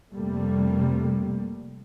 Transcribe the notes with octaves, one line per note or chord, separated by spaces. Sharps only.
F2 C3 G3 A3 A#3